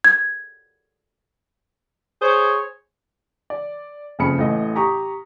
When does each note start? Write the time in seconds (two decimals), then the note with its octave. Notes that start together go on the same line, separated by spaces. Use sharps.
0.04 G#6
2.21 G#4 C5 C#5
3.50 D5
4.19 F#1 F2 C#3 B5 C#7
4.39 A1 A2 D#5
4.75 G4 A#5 C#6 D#6